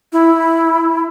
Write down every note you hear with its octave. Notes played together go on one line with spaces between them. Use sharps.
E4